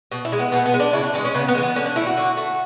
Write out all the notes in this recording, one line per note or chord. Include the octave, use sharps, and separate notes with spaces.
B2
E4
G#3
B3
B2 B3
B3
G#3
D4
C#3 E4
D4
E3 C#4
G#3
C#4
C#3 B3
B3
G#3
E3
B3
D3 C#4
D4
A3 E4
F#4
D3
A3